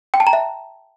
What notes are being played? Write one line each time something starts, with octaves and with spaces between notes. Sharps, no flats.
G5
A5
A#5
E5